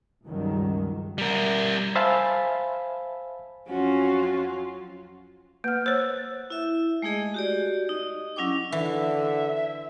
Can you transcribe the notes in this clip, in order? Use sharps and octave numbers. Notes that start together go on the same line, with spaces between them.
C#2 G2 D#3 F#3
G3 A#4
C5 E5 F5 G#5 A5 B5
F2 F#3 C#4 F4 F#4
A#3 B4 F#5 F6
C5 C#5 E6 F#6
E4 E5
G#3 A3 D#4 G#4 D#5
F#4 G4 D5
D#4 D#5
F#3 C#4 E4 G5 D6
D3 E3 E5